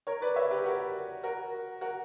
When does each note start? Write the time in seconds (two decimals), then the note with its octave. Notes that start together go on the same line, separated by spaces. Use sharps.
0.07 A#4 C#5
0.22 B4 D5
0.36 C#5 E5
0.51 G4 B4
0.65 F#4 A#4
1.23 F#4 A#4
1.81 F#4 A#4